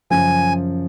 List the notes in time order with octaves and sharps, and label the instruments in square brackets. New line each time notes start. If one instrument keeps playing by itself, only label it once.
[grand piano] F#2 C#3 F3 [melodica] G#5